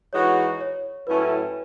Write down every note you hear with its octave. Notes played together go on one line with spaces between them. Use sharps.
E3 G#3 D#4 F#4 C#5
C#5
A2 F#3 A3 C#4 E4 B4